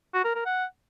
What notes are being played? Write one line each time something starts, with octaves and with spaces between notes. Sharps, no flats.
F#4
A#4
A#4
F#5